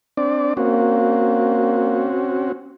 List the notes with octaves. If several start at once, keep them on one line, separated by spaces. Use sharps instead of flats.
C4 D4 D5
A#3 C4 C#4 F#4